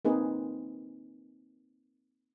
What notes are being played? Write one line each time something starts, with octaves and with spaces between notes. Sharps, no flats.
A#3 C4 D#4 G#4 B4